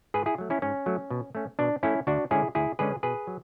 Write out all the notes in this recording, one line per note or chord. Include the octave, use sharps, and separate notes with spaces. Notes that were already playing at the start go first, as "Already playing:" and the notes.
G#2 G#4 B4
E4 G#4
F#3 A3
C#4 E4
G#2 C#4
F#3 A3
B2
A3 C#4
B2 D4
A3 C#4 E4
D2 D4 F#4
D3 G#3 C#4 E4 G#4
D2 E4 G#4
D3 G#3 C#4 G#4 B4
B2 G#4 B4
F#3